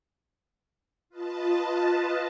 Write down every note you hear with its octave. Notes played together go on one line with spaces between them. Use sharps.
F4 B4 D#5 A5